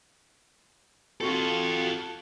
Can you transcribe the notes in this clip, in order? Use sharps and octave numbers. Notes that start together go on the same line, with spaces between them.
C4 F4 F#4 A4 F5